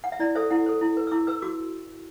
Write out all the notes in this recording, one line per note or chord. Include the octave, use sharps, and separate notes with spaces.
F#5
E5
E4 D5
A4 C5 E5
E4 F#5
A4 C5
E4
B4
E6
E4 D6
B4 E6
F#4 D6